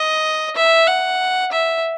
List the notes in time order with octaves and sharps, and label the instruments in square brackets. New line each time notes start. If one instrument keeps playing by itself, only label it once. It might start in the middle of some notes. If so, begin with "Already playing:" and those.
Already playing: [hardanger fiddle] D#5
E5
F#5
E5